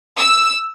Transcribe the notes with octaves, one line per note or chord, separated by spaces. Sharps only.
E6